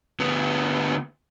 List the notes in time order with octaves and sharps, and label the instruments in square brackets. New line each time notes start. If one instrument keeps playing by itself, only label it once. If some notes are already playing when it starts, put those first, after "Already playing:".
[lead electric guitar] D2 B3